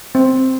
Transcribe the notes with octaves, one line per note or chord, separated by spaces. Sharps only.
C4